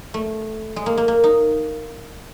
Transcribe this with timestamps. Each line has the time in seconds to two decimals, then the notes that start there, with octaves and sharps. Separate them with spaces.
0.14 A3
0.76 G#3
0.86 A#3
0.97 A#3
1.08 A#3
1.24 D#4